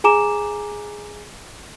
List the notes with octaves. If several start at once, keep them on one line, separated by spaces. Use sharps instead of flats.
G#4 G#5 A#5 D6 E7